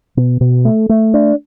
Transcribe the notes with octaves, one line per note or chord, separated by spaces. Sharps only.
B2
B2
A3
A3
D4